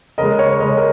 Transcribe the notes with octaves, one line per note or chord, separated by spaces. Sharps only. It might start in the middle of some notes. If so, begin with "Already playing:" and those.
C#3 G#3 A#4 D#5
C#5
C#5
C#3 G#3 D#5
C#5
A#4